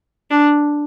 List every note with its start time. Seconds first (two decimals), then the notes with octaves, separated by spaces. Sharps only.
0.31 D4